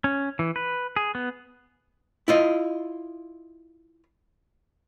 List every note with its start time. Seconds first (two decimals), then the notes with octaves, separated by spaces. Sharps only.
0.04 C#4
0.39 E3
0.56 B4
0.96 G#4
1.15 B3
2.28 E4 F4 D#5